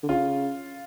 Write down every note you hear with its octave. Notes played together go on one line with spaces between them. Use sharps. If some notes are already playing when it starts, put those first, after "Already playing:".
D3
C#3 F4